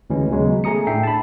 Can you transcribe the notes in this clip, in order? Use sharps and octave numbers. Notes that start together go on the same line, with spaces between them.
D2 E3 G#3 C#4
D#2 C#3 F#3 G#3 B3
A3 G#4 A#5 D#6 C#7
A2 D4 E5 G5 C7
A5 B5